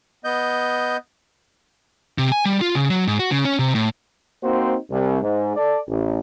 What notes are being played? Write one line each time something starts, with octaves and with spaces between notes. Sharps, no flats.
B3 D#5 G6
C3
G#5
G3
F4
C#3
F#3
G#2
F#4
C#3
C#4
C3
A2
A#3 C4 D#4 F#4 C5
C2
G#2
A4 D5
A1